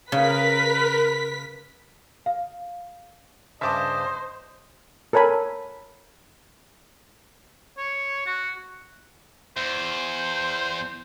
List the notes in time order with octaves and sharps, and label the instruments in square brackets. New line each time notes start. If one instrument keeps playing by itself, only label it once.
[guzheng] C#3 [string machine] A#4 [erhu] B4 [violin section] B6
[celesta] F5
[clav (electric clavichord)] G2 C#3 [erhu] C5 [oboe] D#5 [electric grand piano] E5 A5 D6
[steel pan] A4 A#4 C#5 G#5 B5
[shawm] C#5
F#4
[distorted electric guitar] E2 [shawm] C5